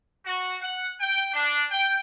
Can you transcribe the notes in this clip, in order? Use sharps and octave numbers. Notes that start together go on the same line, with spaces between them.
F#4
F#5
G5
D4
G5